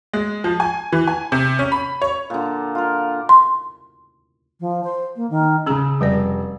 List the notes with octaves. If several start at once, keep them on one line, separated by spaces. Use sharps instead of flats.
G#3
F3
G#5
E3
G#5
C3
C#4
B5
C#5
A#2 D3
F4 A#4
C6
F3
C5
A#3
D#3
C#3 C#4 G#4 A#5 E6
F1 G3 B4 D5